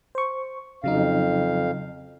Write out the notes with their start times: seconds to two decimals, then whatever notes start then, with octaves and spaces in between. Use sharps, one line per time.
0.15 C5 C#6
0.84 F2 C#3 F#3 D#4 F5